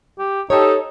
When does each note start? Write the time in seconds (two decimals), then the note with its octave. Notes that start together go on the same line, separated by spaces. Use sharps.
0.18 G4
0.50 D#4 G4 A4 C#5